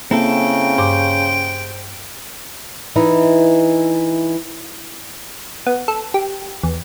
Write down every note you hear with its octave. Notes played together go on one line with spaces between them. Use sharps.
C#3 A#3 C4 E4 A4 G5
G2 C5 D6
E3 D#4 E4
B3
A4
G4
E2